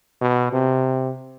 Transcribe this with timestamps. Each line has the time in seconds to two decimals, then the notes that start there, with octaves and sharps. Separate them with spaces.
0.21 B2
0.53 C3